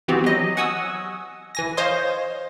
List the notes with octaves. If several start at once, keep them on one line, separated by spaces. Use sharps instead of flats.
E3 B3 C4 F#4 G4
F#3 D#5
F#5 G#5 C#6 D#6 E6
E3 G#5 A#6
C5 C#5 D#5 F5 C6 D#6